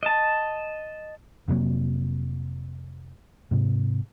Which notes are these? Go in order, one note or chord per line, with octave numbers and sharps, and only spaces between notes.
D#5 A5
F1 C3 F#3 A#3
G#2 C3